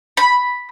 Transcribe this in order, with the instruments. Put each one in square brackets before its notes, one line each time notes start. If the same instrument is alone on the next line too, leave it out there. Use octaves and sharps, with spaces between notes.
[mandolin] B5